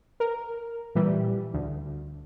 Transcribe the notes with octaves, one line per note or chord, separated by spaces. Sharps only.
A#4
A#2 E3 G3
D2